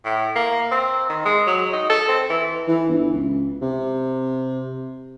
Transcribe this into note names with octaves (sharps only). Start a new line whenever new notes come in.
A2
A#3
C4
D#3
G#3
F#3
D#4
A4
C4
E3
E3
G1
C#2
C3